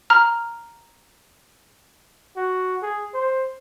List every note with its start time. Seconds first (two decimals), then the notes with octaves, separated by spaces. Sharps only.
0.10 A#5 F6
2.37 F#4
2.82 G#4
3.14 C5